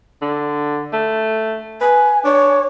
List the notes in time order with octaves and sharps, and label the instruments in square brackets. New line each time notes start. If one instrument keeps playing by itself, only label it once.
[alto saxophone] D3
A3
[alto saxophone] B4 [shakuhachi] G#5
[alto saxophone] D4 [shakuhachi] C#5